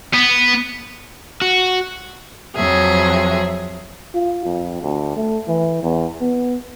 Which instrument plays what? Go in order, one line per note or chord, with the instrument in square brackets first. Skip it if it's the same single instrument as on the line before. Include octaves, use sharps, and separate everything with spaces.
[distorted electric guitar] B3
[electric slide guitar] F#4
[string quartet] F2 F3 F#3 G#4 E5
[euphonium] F4
F2
D2
A3
E3
E2
B3